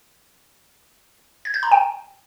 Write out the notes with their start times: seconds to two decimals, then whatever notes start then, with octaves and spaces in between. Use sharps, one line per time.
1.45 G#6
1.54 G6
1.63 A#5
1.71 G5